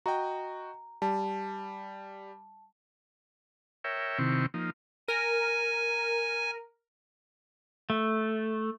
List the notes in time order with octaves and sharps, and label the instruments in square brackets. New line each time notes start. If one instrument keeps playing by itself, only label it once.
[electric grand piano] F#4 D#5 G5 [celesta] A#5
[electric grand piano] G3 [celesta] A5
[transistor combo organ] A#4 C#5 E5 G5
C3 D#3 C4 E4 C#6
F3 A#3 D#4
[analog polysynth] A#4 [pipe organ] G#5
[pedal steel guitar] A3